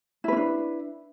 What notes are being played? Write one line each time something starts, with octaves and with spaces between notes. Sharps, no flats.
C#4 D4 E4 B4